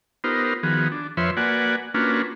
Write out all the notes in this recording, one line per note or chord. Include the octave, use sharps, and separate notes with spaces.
B3 D#4 F4 G4 A#4 C5
D#3 F3 B3 F#4 G#4
D4
F2 F3 B4 C#5 E5 C6
A#3 F#4 B4 D5 F#5 G#5
A#3 C#4 D4 F4 F#4 B4